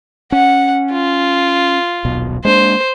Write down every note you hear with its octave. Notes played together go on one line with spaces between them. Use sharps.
C#4 F#5
F4
D#1 B1 B2
G#3 A#3 D4 C5